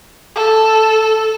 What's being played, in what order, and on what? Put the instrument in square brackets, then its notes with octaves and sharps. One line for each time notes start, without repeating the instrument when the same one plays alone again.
[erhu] A4